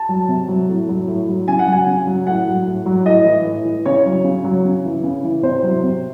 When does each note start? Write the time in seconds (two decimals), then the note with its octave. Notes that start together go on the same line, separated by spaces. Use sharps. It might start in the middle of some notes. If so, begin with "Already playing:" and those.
Already playing: A5
0.09 F#3
0.29 C3
0.48 F#3
0.69 A2
0.89 F#3
1.08 A2
1.28 F#3
1.48 C#3 G#5
1.59 F#5
1.67 F#3 G#5
1.87 C#3
2.07 F#3
2.27 A2 F#5
2.47 F#3
2.67 A2
2.86 F#3
3.06 A2 D#5
3.25 E3
3.46 A2
3.65 E3
3.86 C#3 C#5
4.06 F#3
4.24 C#3
4.44 F#3
4.65 C#3
4.85 E3
5.03 C#3
5.24 E3
5.43 C3 C5
5.63 F#3
5.83 C3